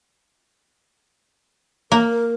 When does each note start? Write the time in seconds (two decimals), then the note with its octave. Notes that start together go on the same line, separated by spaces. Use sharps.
1.92 A#3 A#4